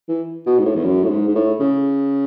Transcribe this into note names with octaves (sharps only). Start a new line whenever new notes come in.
E3
B2
G#2
A2
E2
F#2
A2
G#2
G#2
A2
C#3